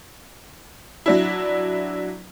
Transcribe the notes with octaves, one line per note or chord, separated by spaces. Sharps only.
F#3 D4 E4